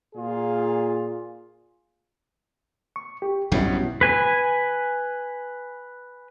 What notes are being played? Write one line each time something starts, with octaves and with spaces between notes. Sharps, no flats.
A#2 F4 G#4
C#6
G4
B1 G2 B2 G3 C#4 E4
B4 G#5